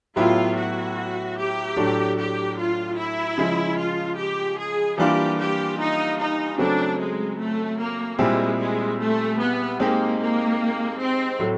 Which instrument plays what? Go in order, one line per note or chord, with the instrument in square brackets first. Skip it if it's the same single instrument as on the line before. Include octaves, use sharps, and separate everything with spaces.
[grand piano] A2 F#3 B3 E4 G4 [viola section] F4
[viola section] F#4
G4
[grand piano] A2 F#3 A3 D4
[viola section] G4
F4
E4
[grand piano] C#3 F3 G#3
[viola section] F4
G4
G#4
[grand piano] E3 G3 A#3 D4 F4 [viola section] G4
[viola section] G4
D#4
D#4
[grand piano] C#3 F#3 A3 C4 [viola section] D4
[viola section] G#3
A3
A#3
[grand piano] A#2 G3 C4 E4 G#4 [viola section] G#3
[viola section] G#3
A3
B3
[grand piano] G#3 C4 D#4 G4 [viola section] A#3
[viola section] A#3
C4
[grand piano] A2 F#3 A3